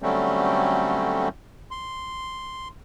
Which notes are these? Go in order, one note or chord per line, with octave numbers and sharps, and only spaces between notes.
D3 F#3 G3 A3 C4 C#4
C6